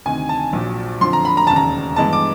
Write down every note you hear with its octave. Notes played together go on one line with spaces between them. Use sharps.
D2 C3 D#3 G#5
A5
A#1 A#2 F#3
F2 D3 F3 C6
A#5
B5
A#5
E1 D#2 C#3 A5
A#5
G2 E3 G#3 B3 A5
D6